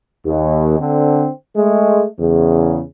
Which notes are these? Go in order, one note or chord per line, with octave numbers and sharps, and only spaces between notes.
D#2
D3 C4
G#3 A3
E2 C#3